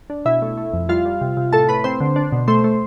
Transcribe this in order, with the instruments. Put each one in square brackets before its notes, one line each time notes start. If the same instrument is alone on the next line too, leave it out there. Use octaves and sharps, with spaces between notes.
[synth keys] D4
B2 E4 E5
A3
A3
F2
G3 F4 F5
G3
C3
C3
A2 A4 A5
A2 B4 B5
C4 C5 C6
D3
D4
B2
A3 C5 C6
A3